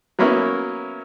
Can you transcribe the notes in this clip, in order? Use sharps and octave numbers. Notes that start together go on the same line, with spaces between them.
F#3 A#3 B3 C#4 E4 A#4